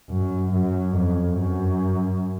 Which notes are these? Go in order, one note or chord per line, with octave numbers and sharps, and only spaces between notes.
F#2
F#2
F2
F#2